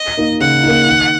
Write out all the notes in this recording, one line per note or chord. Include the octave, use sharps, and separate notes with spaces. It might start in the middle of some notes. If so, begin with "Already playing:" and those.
Already playing: D#5
A#3 D#4
C#3 F#5
A#3 D#4
D#3